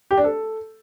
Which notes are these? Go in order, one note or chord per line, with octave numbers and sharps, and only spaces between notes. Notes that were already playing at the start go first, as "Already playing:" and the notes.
G4
D4
A4